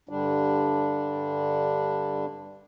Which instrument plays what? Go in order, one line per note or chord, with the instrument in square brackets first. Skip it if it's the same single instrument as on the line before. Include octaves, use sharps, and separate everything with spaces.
[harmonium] G2 D3 G3 D4